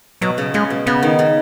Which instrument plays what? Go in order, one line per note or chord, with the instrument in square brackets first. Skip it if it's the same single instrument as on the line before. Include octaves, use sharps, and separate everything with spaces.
[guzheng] B2 [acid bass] F#3
[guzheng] C#3
[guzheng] C#3 [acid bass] G#3
[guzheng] B2
[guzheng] C#3 [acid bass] B3
[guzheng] D#3
C#3